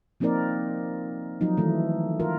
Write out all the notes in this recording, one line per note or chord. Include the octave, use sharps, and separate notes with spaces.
F3 A#3 C4 D#4 A#4 D5
F3 F#3 D#4
D#3 E3 A3
F4 A#4